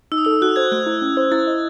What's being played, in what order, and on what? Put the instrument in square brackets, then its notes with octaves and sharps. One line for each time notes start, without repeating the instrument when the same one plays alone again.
[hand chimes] D#4 [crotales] E6
[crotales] D#6
[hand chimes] A4 [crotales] E6
[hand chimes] F#4 [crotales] F#6
[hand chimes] C5 [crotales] G#6
[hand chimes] A3 [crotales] F#6
[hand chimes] E4
C#4
C5
[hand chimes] E4 [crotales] A6
[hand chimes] D#5